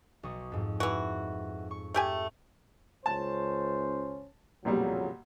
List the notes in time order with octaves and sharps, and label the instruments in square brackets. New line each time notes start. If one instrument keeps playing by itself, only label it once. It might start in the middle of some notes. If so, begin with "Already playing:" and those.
[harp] B1 C#6 D#6
F2 G#2
[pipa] E3 F#4
[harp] C#6
[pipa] A3 G4 G#5
[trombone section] C#2 C#4 C5 [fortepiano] A5
[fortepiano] B1 A#2 G3 [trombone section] F2 C#3 F#3